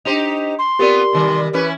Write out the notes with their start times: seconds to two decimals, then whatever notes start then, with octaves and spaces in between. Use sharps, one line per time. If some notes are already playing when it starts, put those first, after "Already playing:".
0.05 D4 D#4 G4 C5 B6 F7
0.59 C6
0.79 B3 C4 F4 G4 A#4 D5
1.13 C3 D#3 G3
1.53 E3 C#4 E4 B4